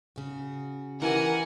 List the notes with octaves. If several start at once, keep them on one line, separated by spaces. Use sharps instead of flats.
C#3 F#4
E3 G4 A#4 F#5 G#5